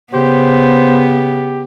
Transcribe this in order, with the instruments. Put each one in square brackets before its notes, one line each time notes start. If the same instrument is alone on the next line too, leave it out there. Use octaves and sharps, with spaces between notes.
[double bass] C#3 [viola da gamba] B3 [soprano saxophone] G4 [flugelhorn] C5